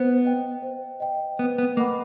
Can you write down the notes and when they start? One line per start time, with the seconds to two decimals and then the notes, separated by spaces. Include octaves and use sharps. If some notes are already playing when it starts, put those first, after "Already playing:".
Already playing: B3 C5
0.25 D#5 G5
0.62 C5
1.00 D#5 G5
1.39 B3 B4
1.58 B3
1.77 A#3 D#5 F#5 B5 D6